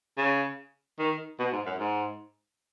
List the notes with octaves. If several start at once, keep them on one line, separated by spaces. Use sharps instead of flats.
C#3
D#3
B2
G#2
F#2
G#2